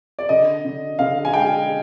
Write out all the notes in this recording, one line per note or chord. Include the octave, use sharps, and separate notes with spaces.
D5
D3 D#5
D3
D3 F5
G#5
G#3 G5